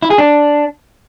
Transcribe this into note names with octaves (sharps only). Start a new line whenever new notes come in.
E4
G#4
D4